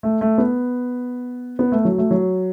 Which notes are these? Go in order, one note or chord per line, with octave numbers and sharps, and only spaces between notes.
A3
A3
B3
B3
A3
F#3
A3
F#3